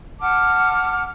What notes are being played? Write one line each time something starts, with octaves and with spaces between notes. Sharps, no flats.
F#5 A5 D6 F6